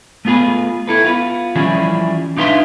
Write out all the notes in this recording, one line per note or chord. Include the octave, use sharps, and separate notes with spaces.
A3 B3 F4 G#4 B4
E4 A4 B4
B3 F4 B4
E3 F3 G3 C#4 E4 G#4
D4 D#4 F4 B4 E5 C6